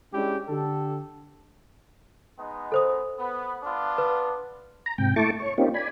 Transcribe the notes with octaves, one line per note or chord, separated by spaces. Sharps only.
G#3 C#4 D4 E4 G4
D3 G4 A4
G#3 B3 D#4
A4 C5 D#6
B3
B3 D4 F4
B4
A#5
G#2 C3 G5
A3 E4 A5 C#6 D6
C#5 C#6
A#3 C4 C#4 D#4 F4 G4
D5 G#5 B5